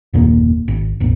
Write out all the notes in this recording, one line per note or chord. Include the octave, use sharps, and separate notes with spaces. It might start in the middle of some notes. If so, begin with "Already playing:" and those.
F#1 D#2 A#2 A#3
G#1
E1 A1